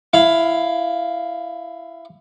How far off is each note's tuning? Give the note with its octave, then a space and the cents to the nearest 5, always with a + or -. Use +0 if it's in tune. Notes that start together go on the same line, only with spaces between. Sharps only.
E4 +15 F5 +0